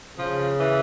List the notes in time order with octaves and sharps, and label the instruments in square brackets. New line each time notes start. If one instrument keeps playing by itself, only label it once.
[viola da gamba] C#3 [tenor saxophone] F3
[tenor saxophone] E3